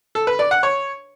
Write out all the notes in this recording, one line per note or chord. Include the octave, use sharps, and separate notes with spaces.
A4
B4
D5
F#5
C#5